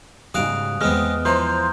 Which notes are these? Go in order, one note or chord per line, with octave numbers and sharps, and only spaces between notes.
G#2 C#3 G3 F#4 F5 D#6 F#6 D7
E2 G2 G#3 B3 C4 D#5 F6
E3 F3 C5 A#5 C6